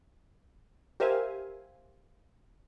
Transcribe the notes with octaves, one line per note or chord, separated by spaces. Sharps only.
G4 A#4 C5 E5 F5 G#5